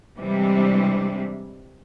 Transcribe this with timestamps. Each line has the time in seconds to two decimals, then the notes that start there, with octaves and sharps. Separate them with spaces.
0.17 C3 E3 G3 G#3 D4